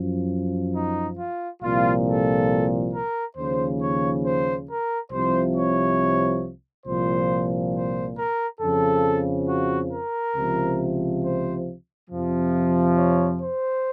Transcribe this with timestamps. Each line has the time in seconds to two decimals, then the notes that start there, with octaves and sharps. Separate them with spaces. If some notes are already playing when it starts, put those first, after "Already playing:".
Already playing: F#2 F3
0.75 D#4
1.19 F4
1.63 C2 A#2 F3 F4
2.07 A4
2.93 A#4
3.37 D#2 C#3 F3 C5
3.81 C#5
4.25 C5
4.68 A#4
5.12 C2 C3 F3 C5
5.55 C#5
6.86 C2 A#2 F3 C5
7.74 C5
8.17 A#4
8.61 F2 C#3 F3 A4
9.49 F#4
9.92 A#4
10.36 C#2 C3 F3
11.24 C5
12.10 F2 C3 F3
12.98 C#5
13.42 C5